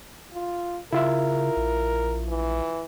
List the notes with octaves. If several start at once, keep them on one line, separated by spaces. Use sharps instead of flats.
F4
C#3 E4 F4 A#4 E5
A#1
E3